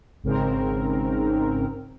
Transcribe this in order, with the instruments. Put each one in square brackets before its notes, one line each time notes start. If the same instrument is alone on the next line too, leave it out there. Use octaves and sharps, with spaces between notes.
[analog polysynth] G#1 G#2 C#3 C4 A#4